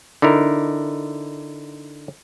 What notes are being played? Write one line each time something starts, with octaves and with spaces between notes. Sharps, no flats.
D3 D#4 E4 A#4